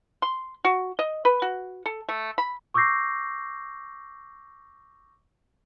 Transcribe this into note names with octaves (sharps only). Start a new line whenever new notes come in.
C6
F#4
D#5
B4
F#4
A4
A3
B5
C#6 D6 E6 G6 A#6 C7